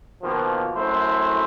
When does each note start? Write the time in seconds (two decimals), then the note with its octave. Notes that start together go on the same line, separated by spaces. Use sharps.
0.23 B2 D#3 F3 A#3
0.75 F#2 A3 E4 C5